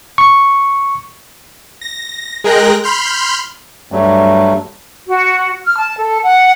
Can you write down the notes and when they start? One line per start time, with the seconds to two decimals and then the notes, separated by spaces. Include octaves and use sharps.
0.18 C#6
1.81 A#6
2.44 G#3 G#4 A#4 G5 F#6 A#6
2.84 B5 C6 F6 G6
3.92 G2 F#3 G3 A3
5.07 F#4
5.65 F6
5.77 A5
5.97 A4
6.23 F#5